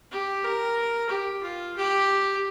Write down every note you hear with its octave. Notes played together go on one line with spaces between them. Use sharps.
G4
A#4
G4
F4
G4